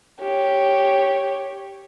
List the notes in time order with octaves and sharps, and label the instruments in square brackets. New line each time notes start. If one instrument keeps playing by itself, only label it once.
[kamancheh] G4 C#5